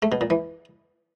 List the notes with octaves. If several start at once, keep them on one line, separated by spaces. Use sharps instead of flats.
A3
B2
A#2
E3